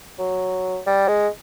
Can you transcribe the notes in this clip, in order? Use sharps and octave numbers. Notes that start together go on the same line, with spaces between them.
F#3
G3
G#3